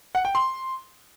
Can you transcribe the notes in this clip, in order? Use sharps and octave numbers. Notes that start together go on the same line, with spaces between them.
F#5
G5
C6